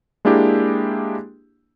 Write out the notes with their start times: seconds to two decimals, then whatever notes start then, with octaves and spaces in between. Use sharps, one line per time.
0.25 G#3 A#3 D4 E4 G4 G#4